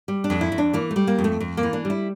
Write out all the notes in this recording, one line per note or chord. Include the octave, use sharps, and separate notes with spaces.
G3
D4
F2
E4
F2
D4
E3 A#3
A3
G3
A#3
F2
A3
F2
A#3
E3
D4
G3
E4